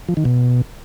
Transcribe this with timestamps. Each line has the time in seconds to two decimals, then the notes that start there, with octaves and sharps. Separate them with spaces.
0.09 F3
0.17 D#3
0.25 B2